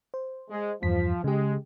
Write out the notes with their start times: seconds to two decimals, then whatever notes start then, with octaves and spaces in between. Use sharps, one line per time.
0.14 C5
0.50 G#3
0.82 E2 G2 F3 B6
1.24 C#3 G#3 G4